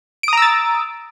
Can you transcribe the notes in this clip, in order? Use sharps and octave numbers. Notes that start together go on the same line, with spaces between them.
A#5 D#6 E6 A6 D7